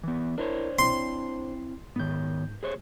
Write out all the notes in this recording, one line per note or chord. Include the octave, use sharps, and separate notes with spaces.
E3 B3
D4 E4 A#4 C5 C#5
C4 E4 C6
G#2 D#3 B3 G6
G#4 C5 C#5